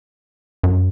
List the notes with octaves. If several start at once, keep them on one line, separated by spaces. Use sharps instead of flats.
F#2